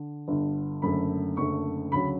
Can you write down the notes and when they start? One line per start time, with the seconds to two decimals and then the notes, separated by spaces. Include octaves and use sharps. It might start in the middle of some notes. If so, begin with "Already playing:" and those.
Already playing: D3
0.28 G1 G2 D3
0.82 F#1 F#2 D3 A3 B5
1.37 F#1 F#2 D3 A3 C#6
1.92 D2 C#3 F#3 B5